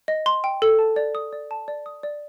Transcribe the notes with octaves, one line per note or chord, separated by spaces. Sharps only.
D#5
C6
G5
A4
A5
D5
D#6
D5
A5
D5
D#6
D5